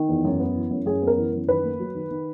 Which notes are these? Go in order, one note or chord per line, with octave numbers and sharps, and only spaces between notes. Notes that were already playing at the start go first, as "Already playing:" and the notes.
Already playing: D#3
E2
F#2
B3
E3
F#2
F#2 G#4
B3
A#4
E3
F#2
D#3 B4
A#3
F#3
D#3
D#3